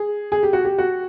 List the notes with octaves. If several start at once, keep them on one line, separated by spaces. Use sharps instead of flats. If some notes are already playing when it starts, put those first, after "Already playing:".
Already playing: G#4
G#4
G4
F#4
G4
F#4